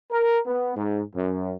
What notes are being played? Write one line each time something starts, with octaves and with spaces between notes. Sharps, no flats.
A#4
B3
G#2
F#2